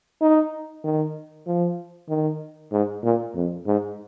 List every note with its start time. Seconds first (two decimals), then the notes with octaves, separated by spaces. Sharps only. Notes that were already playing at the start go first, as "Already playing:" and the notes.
0.21 D#4
0.84 D#3
1.47 F3
2.09 D#3
2.72 G#2
3.04 A#2
3.35 F2
3.66 G#2